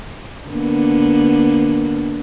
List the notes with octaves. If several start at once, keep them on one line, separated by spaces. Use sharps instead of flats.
D3 A#3 B3